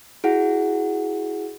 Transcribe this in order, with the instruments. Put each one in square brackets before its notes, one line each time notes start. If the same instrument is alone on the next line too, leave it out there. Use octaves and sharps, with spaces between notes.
[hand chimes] E4 F#4 G#4 F#5